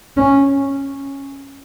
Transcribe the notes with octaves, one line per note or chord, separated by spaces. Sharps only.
C#4